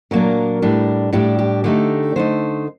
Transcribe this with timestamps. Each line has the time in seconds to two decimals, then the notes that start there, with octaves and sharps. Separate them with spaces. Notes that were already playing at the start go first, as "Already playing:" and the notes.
0.11 A#2 F#3 A#3 D4 A#4
0.62 A2 G3 D4
1.13 A2 G3 D4 G4
1.39 G4
1.64 D3 A3 D#4 G4
2.16 D3 A3 D#4 C5